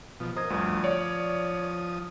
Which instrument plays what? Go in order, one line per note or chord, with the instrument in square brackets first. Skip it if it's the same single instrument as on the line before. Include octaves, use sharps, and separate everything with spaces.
[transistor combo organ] B2 F3
[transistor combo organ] A#4 D#5 [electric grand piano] C5 G#6
[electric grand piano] D2 G2 [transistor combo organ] F3 D#6
[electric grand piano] C#5 D5